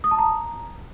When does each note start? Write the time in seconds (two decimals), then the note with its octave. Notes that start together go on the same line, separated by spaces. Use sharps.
0.04 D#6
0.11 A5
0.19 A#5